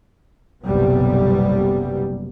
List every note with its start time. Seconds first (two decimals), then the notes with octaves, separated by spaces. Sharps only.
0.64 F#1 B1 C3 G3 B3